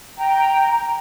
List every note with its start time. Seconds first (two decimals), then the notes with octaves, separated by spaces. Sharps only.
0.17 G5 A#5